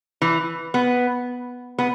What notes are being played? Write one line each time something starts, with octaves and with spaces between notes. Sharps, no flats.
E3
B3
B3